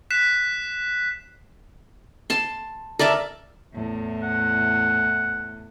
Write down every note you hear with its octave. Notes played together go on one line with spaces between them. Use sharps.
F#6 B6 C7 E7
A5 C6
A#4 D5 E5 A5
E2 A2
F#5